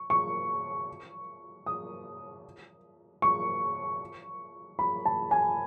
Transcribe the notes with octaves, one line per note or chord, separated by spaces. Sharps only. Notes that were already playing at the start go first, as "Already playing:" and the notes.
Already playing: C#6
C#6
D#6
C#6
B5
A5
G#5